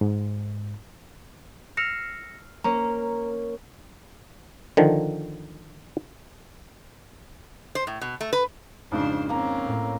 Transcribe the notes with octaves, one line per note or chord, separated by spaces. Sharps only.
G#2
E6 F6 A#6 C7 C#7
A#3 C#4 A#5
D3 D#3 F3
C5
A2
B2
A3
B4
F2 G#2 C#3 D4 C5
A#3 C4 C#4 A#5
A2